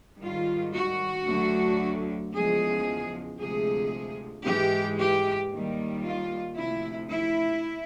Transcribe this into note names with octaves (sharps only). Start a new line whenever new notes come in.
G#2 D#3 G3 F4
F#4
D2 D3 F#3
E2 C#3 F3 G#3 G#4
D2 C3 F3 G#3 G#4
G#2 E3 G#3 G4
G4
D#2 D#3 G3
F4
D2 C3 F3 E4
E4